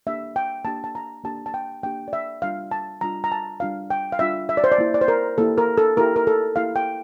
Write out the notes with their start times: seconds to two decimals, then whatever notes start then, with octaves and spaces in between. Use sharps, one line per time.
0.07 A#3 D4 G4 E5
0.36 G5
0.65 A#3 D4 G4 A5
0.84 A5
0.95 A#5
1.24 A#3 D4 G4 A5
1.46 A5
1.54 G5
1.83 A#3 D4 G4 G5
2.08 D5
2.13 E5
2.42 G3 D4 F4 F5
2.71 A5
3.01 G3 D4 F4 A#5
3.24 A#5
3.32 A5
3.60 G3 D4 F4 F5
3.90 G5
4.12 F5
4.19 G3 D4 F4 E5
4.49 E5
4.57 D5
4.64 C5
4.72 D5
4.78 A#3 E4 G4
4.94 D5
5.01 C5
5.08 A#4
5.38 A#3 E4 G4 A4
5.58 A#4
5.77 A4
5.97 A#3 E4 G4 A#4
6.16 A#4
6.27 A4
6.56 A#3 E4 G4 F5
6.76 G5